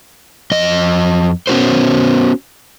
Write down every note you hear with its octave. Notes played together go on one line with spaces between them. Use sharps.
F2 D#5
B3 C#4 F4 F#4 A#4 C5